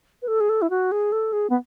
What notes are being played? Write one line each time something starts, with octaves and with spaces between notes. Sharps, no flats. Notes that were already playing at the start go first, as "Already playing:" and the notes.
B4
A4
G#4
A4
E4
F#4
G#4
A4
G#4
B3